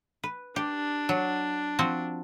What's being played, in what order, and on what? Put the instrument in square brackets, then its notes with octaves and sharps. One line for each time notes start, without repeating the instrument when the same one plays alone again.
[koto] B4
[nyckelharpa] D4 [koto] G4
[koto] F#3
F3 C4 F#4